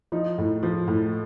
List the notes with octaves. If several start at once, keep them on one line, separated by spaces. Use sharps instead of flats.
F3 D#4
A2
F3
A2